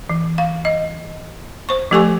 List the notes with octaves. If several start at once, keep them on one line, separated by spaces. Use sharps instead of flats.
E3
F5
D#5
C5 C#6
F3 A3 G4 A4 G#5 C#6